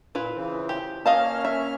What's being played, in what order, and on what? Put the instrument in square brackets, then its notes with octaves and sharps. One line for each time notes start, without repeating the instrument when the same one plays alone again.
[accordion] A#2 [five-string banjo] E4 F4 B4
[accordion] C#3 E3 C4
[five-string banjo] G4
[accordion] A#3 C#4 F6 [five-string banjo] D#5 F5 A5
[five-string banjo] E5